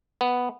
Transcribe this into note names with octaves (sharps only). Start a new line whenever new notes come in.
B3